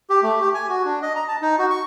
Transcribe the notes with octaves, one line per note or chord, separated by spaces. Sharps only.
G4
A3
G4
G#5
F#4
D4
D#5
A#5
A5
D#4
F#4
C#6